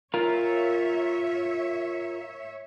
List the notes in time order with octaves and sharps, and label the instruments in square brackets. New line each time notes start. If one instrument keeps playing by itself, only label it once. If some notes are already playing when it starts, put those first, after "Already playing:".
[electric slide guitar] F4 A#4 [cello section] C#5 E5